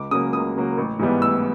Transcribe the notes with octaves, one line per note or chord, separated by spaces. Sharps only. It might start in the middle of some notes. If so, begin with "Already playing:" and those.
Already playing: C#2 D6
C#3 F#3 A#3 D#6
C#2 D#6
C#3 F#3 A#3
A1
G#2 E3 G3 B3
A1 E6